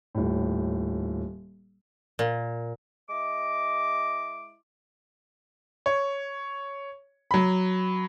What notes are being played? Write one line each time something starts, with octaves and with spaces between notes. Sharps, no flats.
D#1 A2
A#2
G#3 E4 D#5 D6
C#5
F#3 B5